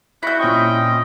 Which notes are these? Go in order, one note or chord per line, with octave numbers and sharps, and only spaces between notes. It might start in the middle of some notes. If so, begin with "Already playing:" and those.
E4 F#4 G6
A#2 C4 C#4 D#5 G5 C#6